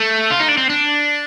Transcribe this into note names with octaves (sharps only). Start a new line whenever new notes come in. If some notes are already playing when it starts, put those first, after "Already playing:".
Already playing: A3
F4
D#4
D4
C4
D4